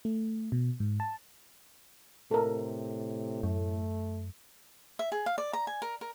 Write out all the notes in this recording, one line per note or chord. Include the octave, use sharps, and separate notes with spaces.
A3
B2
G#2
A5
A2 C3 A4 A#4
F#2 A3
E5
G#4
F5
D5
A#5
G#5
A#4
A#4